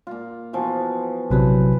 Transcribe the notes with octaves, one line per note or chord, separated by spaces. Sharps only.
A#2 F4
B2 E3 F3
A#1 C3 F#3 E4 B4 C5